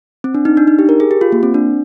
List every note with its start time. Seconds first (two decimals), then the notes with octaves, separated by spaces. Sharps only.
0.24 C4
0.34 D4
0.45 D#4
0.57 D4
0.67 D#4
0.79 G4
0.89 A#4
1.00 G#4
1.11 G4
1.21 F4
1.32 A#3
1.43 C4
1.54 D4